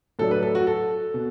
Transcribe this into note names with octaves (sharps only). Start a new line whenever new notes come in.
A2 F#3 D4 A4
B4
A4
F#4
A4
B2